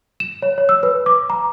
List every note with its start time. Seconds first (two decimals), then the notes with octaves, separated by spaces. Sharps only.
0.20 E7
0.42 C#5
0.58 C#5
0.69 E6
0.83 B4
1.06 D6
1.30 A#5